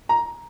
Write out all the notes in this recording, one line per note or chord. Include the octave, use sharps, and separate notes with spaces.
A#5